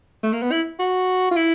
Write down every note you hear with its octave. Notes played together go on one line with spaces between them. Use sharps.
A3
A#3
B3
E4
F#4
F4
E4